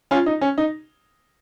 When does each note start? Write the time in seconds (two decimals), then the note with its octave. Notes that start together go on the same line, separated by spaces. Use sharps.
0.11 C#4 F4
0.26 D#4
0.41 C#4
0.58 D#4